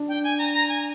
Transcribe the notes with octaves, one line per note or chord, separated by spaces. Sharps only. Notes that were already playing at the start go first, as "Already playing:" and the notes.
Already playing: D4
G5
G#5
A#5
A#5
G#5